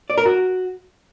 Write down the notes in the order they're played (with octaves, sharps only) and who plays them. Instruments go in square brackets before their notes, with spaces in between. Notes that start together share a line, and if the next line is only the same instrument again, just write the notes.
[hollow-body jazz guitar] D5
A#4
F#4